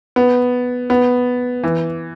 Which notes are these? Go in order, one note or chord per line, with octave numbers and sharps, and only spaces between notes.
B3
B3
E3